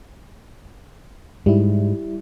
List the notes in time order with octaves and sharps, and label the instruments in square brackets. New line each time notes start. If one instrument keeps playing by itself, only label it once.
[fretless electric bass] G#2 [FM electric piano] G3 E4